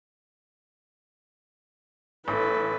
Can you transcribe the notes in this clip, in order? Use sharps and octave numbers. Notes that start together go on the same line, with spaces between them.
A1 A4 B4